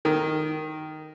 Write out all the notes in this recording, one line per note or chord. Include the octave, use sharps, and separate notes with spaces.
D#3